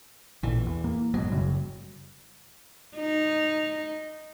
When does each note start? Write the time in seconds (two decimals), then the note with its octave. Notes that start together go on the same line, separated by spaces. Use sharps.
0.43 A1 A#2 E3
0.67 E2
0.84 A#3
1.14 F#1 G#2 B2 F#3
1.32 F#2 C#3 G3
2.97 D#4